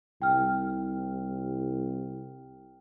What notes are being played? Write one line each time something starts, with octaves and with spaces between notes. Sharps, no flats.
C2 G5 F6